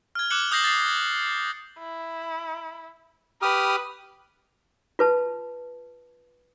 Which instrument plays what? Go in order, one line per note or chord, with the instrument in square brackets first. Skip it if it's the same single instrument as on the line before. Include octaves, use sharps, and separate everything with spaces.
[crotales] F6 G#6
D6 F6 F#6 C#7 F#7
D#6 G6 A#6 C7 F#7
A6 C7
[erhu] E4
[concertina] G4 D#6 F6 [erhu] B4
[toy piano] F4 B4 A5